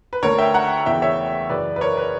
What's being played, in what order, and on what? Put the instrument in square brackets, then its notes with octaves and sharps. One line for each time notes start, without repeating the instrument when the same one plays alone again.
[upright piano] B4
D2 D3 A#4 C#5
E5 G5
F#5 A#5
E2 C#3 E3 E5 G5
C#5 E5
F#2 C#3 E3 B4 D5
B4
A#4 C#5
B4